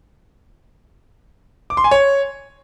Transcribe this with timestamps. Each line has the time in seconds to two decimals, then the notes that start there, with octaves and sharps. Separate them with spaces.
1.70 D6
1.77 C6
1.84 G#5
1.91 C#5